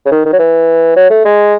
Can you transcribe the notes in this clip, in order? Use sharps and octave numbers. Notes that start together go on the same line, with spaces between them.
C#3
D#3
D#3
F#3
E3
F#3
A3
G#3